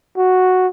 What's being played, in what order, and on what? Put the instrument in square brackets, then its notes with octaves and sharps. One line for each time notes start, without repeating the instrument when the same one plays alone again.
[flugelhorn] F#4